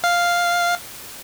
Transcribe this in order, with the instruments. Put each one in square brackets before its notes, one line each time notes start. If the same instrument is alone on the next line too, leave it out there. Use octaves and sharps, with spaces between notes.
[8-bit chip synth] F5